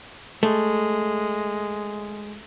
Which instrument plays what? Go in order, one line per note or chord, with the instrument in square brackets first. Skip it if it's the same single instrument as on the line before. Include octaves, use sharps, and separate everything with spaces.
[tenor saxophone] G#3 [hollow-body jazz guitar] A3